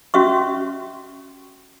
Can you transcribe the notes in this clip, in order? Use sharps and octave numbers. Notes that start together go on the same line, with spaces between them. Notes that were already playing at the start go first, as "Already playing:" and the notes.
C#4 F#4 E5 C#6